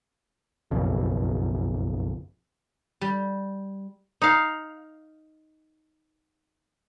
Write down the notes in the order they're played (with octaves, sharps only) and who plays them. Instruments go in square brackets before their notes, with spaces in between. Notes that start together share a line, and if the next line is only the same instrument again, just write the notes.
[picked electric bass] F#1 B1 F2
[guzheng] G3
[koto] D#4 F5